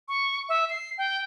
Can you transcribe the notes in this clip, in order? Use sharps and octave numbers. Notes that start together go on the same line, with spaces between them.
C#6
E5
C7
G5